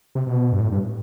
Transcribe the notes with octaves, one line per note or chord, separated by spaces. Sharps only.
C3
B2
G2
A2
G2